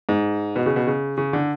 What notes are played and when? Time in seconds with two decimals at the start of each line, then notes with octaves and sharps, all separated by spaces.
0.09 G#2
0.56 B2
0.66 C#3
0.76 B2
0.87 C#3
1.17 C#3
1.33 D3